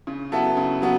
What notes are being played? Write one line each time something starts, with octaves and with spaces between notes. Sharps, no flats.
C#3
F#3 B3 E4 A4
C#3
F#3 B3